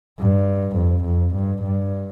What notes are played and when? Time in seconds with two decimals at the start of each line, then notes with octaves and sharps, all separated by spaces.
0.20 G2
0.77 F2
1.05 F2
1.35 G2
1.63 G2